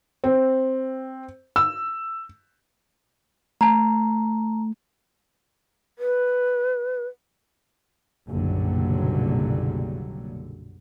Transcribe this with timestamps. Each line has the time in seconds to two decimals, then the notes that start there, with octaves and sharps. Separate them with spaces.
0.24 C4
1.56 E6
3.61 A3 A5 A#5
5.99 B4
8.29 F#1 B1 A#2 D3 F#3 G3